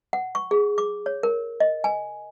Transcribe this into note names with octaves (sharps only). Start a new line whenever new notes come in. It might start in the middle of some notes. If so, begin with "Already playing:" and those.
F#5
C#6
G#4
D6
C#5
A#4
D#5
G#5